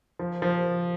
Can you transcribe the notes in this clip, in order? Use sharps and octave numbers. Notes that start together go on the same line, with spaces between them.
F3
F3